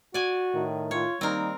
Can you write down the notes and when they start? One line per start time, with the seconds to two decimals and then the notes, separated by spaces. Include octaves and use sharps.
0.14 F#4 D5 G#5
0.54 A2 D#3
0.91 F4 C#5
1.21 D#3 G3 A#3 C4 D#4 A#4